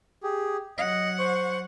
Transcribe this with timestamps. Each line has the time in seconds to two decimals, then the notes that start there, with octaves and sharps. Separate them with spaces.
0.23 G4 G#4
0.78 F#3 D#5 F#5
1.19 C5 C#6